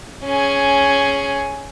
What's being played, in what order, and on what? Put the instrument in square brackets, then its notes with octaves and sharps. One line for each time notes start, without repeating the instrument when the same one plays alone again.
[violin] C#4 G#4